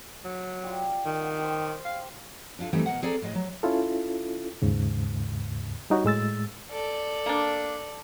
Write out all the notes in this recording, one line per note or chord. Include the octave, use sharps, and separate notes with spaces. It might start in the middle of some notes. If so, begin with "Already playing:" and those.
F#3
G3 F4
D#3
F#5 G5
G4 C5
F5
D4 E4 F4 A4
E3 G3 A3 C4 D#4
B2 A#4 F#5
C4 G#4 A4 D5 A#5
A2 G#3 D#5
F#3
C#4 E4 F4 A4
D#2 G#2 C#3
G3 D#4 F#4 C#5
A2 G#3 E6 A6
A4 D5
A#3 D4